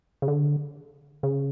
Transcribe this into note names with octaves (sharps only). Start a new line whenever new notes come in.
C#3
D3
C#3